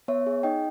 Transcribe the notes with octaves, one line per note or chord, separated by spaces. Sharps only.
B3 C#5 E5
G#4
D#4 D#5 G5